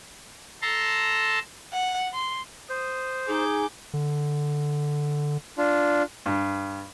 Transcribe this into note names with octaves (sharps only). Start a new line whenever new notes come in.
A4 A5 A#5 C6
F#5
C6
C5 D#6
D#4 G#4 D6 G6
D3
D4 F4
G2